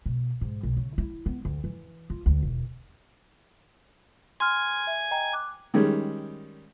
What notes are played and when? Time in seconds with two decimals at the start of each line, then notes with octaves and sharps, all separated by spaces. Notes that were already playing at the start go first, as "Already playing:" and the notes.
0.06 B2
0.41 G#2
0.63 B1
0.77 C#3
0.98 E4
1.26 B3
1.45 D2
1.64 E3
2.10 F4
2.26 D2
2.43 E1
4.40 G#5 C6 F6
4.87 E5
5.11 D#5 G5 A#5
5.33 D6 F#6
5.74 D#3 G3 G#3 C#4